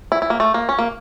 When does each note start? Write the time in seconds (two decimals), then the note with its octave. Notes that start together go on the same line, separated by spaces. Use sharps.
0.12 E4
0.22 E4
0.30 A#3
0.40 A3
0.54 A#3
0.69 C#4
0.79 A#3